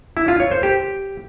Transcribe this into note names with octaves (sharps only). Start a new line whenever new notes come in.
E4
F4
C#5
C5
G4